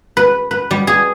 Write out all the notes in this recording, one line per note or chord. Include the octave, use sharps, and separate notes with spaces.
B4
B4
G3
G#4